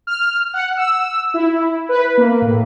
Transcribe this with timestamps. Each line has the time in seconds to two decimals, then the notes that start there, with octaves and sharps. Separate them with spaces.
0.07 F6
0.54 F#5
0.77 E6
1.34 E4
1.89 B4
2.18 A#3
2.42 A2